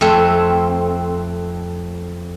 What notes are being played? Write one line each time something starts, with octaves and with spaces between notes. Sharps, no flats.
F2 A3 C4